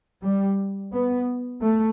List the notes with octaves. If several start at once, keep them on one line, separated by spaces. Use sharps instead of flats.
G3
B3
A3